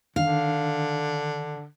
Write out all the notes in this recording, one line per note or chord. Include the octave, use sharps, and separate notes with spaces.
D3 D#3 D4 F5